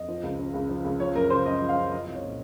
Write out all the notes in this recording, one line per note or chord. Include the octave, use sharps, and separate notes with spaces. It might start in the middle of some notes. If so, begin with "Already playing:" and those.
Already playing: F2 D#5
F3
C#2
C#3
C#2
F3
C#2
F3 C#5
F#2 A#4
C#3 C5
F#2 D#5
F3
F5
F#2
F3 D#5
C2 D#5
C#5
A#2